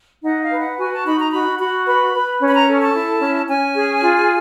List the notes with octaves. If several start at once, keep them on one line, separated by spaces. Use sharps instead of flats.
D#4 F#5
F5
B4
F#5
F#4 G#5
A5
D#4 B5
A#5
F#4 B5
F#4 B5
B4 B5
B4
C#4
B5
A#5
A4
A5
E4
C#4
C#4 G#5
G#4
F4